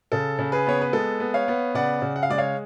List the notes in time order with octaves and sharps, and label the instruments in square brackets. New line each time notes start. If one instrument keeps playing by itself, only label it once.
[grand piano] C#3 A4
C#3
G#4 B4
B3 C#5
B4
G#3 A4
B3
C#5 F5
B3
C#3 D5 F#5
C#3
F#5
F5
G#3 D5
C#5 F5